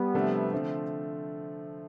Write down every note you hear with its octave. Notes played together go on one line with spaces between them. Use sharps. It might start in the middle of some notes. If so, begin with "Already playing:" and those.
Already playing: G3 B3
C3 F3 A3 D4
D3 F3 A3 C4